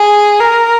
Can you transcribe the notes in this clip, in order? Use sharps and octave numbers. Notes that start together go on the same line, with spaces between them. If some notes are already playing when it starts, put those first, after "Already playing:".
Already playing: G#4
A#4